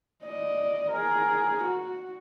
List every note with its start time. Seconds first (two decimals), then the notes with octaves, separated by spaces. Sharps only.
0.25 D5 D#5
0.91 G#4 A#4
1.64 F#4